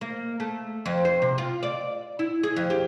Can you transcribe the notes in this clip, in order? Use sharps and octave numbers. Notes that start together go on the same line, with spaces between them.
A#3
A3
F2
C5
C3
F4
D5
E4
G#4
F2
G4